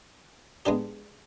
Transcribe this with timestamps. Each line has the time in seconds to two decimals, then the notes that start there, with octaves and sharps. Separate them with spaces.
0.66 G#3 B3 D4 G4